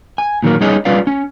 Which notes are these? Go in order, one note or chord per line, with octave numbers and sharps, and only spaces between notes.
G#5
A#2 D#3 F#3 A#3
G3 C#4 D#4 G#4 C#5 D#5
G3 C#4 F4 B4 D5 F5
C#4